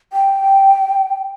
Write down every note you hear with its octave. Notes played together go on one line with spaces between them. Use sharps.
G5